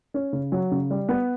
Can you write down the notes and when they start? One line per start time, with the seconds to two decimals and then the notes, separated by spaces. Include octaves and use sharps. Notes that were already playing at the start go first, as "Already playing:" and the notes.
0.14 C#4
0.33 C#3
0.52 F#3
0.71 C#3
0.90 G3
1.09 B3